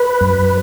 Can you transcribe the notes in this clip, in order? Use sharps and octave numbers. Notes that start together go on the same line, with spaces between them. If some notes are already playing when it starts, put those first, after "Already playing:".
Already playing: B4
F#2